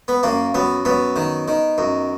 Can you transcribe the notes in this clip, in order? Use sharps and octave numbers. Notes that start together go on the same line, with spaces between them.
B3
F#2 A#3
F#2 B3
F#2 B3
D#3
D#3
F#2